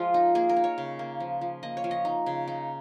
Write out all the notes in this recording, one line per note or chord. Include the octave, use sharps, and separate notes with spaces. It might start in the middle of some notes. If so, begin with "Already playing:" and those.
Already playing: F3 G#3 F4 G#4
D#4
A#3 G#4
A#4
D#4
C#5
C#3
A#3
F3
F3
A#3 D#5
C#5
F3
D#5
D#4
C#3
D#4